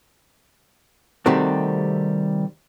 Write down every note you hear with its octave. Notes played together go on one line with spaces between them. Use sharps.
C3 D#3 G3 A3 C4 F#4